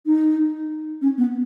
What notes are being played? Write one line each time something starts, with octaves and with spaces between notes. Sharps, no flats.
D#4
C#4
B3